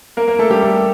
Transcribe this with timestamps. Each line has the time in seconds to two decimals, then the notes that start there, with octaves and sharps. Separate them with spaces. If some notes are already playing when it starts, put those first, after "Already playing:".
0.17 A#3 A#4
0.28 A#3 A#4
0.39 A3 A4
0.50 G3 G4
0.62 A3 A4